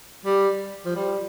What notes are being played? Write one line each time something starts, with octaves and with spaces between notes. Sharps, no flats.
G3
F3
G3